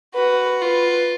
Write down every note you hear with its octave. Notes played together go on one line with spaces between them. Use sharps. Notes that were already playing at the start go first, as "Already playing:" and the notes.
F#4 B4
F4 B4